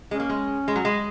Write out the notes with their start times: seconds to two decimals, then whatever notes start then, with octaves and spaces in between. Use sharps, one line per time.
0.10 G#3 C#4
0.20 A#3
0.30 G#3
0.68 G#3
0.76 F#3
0.85 G#3